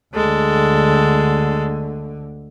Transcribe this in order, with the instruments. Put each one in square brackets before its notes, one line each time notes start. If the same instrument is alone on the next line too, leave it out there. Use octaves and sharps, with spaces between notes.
[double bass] D2 D3 [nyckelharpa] G#3 A4